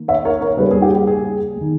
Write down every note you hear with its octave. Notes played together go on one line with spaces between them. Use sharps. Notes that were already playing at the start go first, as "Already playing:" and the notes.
Already playing: D#3 A#3
C#5 E5
A#4 C#5
A#4 C#5
C#3 G3 A#3 G#4 B4
G#4
G4
G#4
D#3 G#3